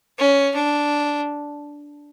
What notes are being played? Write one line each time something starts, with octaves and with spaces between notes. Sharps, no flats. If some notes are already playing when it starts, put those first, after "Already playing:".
C#4
D4